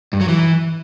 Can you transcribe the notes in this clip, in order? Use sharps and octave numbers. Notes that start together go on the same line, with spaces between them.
G2
F#3
E3